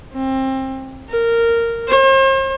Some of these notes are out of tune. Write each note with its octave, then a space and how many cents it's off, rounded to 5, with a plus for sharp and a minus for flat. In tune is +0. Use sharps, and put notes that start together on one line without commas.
C4 +25
A#4 -10
C5 +45